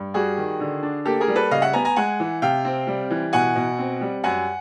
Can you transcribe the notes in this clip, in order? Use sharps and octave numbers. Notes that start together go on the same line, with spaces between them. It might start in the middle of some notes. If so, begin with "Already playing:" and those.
Already playing: G2
G3 F#4 G#4
D#3
D3
D4
A#3 G4 A4
G#4 A#4
G3
A4 B4
C#3 D#5 F5
E5 F#5
B3 G#5 A#5
G#5 A#5
G#3 F#5 G#5
E3
C3 F5 G5
C4
G3
E3
B2 F#5 G#5
B2
C4
G3
F#2 F#5 G#5